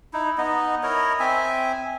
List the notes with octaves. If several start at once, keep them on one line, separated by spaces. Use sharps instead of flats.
D#4 E4
B3 D#4 D#5
E4 A#4 C#5 D#5
C4 E5 G#5